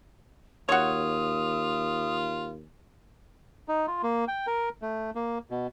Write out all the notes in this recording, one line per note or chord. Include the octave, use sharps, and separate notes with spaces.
D#2 F4 F#4 C#5 D#6
D#4
F4
A#3
G5
A#4
A3
A#3
B2